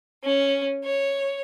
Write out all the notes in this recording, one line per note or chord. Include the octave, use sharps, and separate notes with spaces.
C#4
C#5